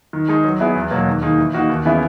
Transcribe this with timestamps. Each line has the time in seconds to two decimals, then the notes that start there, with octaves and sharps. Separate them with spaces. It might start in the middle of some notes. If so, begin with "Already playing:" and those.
0.13 D#3
0.29 G#3 D#4 G#4
0.44 F#3
0.60 B3 E4 G#4 B4
0.75 E2
0.91 B2 F#3 A#3
1.07 D#2
1.22 D#3 A#3 D#4 G#4
1.38 E3
1.53 A#3 D#4 F#4
1.69 D#2
1.85 C#3 E3 B3 E4